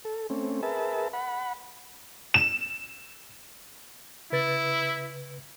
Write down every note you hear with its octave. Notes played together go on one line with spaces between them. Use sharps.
A4
A3 C4 C#4
G#4 A#4 B4 E5 A5
F#5 B5
E7
C#3 E4 B4 A6